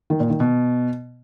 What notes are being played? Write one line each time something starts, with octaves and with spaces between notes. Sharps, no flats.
D#3
A#2
D#3
B2